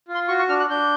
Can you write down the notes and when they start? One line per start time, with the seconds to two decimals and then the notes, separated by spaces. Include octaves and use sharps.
0.08 F4
0.14 C6
0.28 F#4 C#6
0.39 C#6
0.49 D4 F6
0.60 F#6
0.70 D4 G6